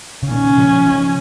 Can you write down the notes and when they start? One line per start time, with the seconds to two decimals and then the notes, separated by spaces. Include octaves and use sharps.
0.23 C#3
0.31 A#2 D#3 C#4
0.58 C#3 F3
0.86 C#3 F3